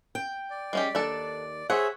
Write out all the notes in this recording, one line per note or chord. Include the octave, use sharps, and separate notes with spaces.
G5
D5
G#3 C#4 G4
D#2 D4 A4
G#4 C5 C#5 E5 F#5